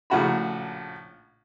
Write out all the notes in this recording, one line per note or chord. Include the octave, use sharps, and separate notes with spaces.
A#1 A2 C#3 F#4 A#5 B5